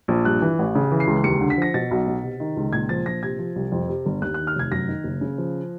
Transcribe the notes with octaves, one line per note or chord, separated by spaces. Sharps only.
A#1
G2 F#6
E3
A1
C#3
E3
C7
C#2
D#2 C#7
D3
B6
F3 A#6
B2 A6
B1
B2
C3
D#3
C#2
A#2 G#6
F3 A6
A#1 A#6
C3 G#6
F3
C2
F2
C3
G1
D#2 F#6
D#3 F#6
F6
F1 G#6
F#2 A#6
D#3
F#1
C#3
F3